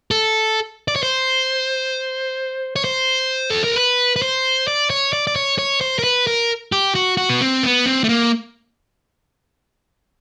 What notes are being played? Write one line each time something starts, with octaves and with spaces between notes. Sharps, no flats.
A4
D5
C#5
C5
C#5
C5
A4
A#4
B4
B4
C5
D5
C#5
D5
D5
C#5
C#5
C5
A#4
B4
A#4
G4
F#4
F#4
B3
C4
B3
C4
A3
A#3